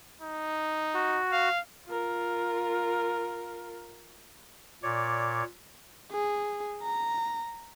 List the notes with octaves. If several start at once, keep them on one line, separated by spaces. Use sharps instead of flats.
D#4
F#4
F5
F4 A#4
A#2 C#5 D5
G#4
A#5